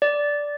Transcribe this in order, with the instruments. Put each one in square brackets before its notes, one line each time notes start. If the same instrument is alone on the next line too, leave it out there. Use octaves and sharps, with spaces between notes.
[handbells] D5